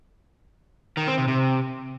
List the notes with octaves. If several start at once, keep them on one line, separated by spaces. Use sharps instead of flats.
D#3
C4
C3
C3